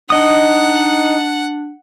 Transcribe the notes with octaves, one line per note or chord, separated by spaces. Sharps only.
D4 D#4 D#5 F#5 D#6